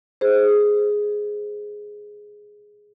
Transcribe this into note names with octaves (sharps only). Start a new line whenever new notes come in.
G#4 C5